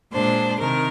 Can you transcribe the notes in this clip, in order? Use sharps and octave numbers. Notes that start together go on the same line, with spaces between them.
A#2 G#3 D4 C5
C3 D#3 A#4